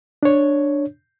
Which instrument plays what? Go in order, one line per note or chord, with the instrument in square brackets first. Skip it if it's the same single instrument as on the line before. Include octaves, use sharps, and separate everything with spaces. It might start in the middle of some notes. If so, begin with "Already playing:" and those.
[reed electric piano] D4 C#5